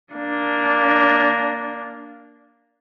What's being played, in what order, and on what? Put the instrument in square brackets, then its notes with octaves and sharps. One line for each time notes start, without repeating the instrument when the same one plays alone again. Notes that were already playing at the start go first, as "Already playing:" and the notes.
[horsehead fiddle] A#3 D4